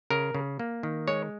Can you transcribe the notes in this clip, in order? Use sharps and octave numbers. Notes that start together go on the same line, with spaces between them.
C#3 A#4
C#3
A#3
D#3
G#3 C#5